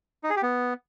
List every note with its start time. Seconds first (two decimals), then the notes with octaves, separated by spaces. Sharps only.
0.24 D#4
0.30 G#4
0.36 G4
0.43 B3